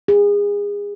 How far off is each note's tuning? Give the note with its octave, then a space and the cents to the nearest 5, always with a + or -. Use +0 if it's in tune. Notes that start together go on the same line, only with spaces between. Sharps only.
G#4 -30